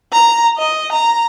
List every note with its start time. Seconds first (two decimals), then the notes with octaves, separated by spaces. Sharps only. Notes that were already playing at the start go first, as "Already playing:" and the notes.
0.13 A#5
0.58 D#5
0.92 A#5